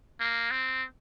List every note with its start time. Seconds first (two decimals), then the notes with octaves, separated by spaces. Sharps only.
0.20 A#3
0.51 C4